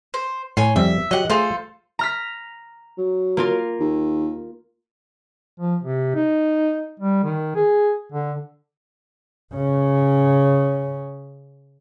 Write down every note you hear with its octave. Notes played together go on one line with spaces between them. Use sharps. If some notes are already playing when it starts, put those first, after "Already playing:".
C5
A2 C#5 G#5 C6
F2 G3 C4 E5
F#3 G4 D#5 F#5
A3 F4 G#4 A4 C5
A#5 F6 B6
F#3
A#3 F4 A#4
D#2
F3
C3
D#4
G3
D#3
G#4
D3
C#3 C#4